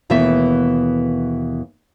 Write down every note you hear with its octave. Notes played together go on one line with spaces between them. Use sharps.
D#2 B2 E3 A3 B3 E5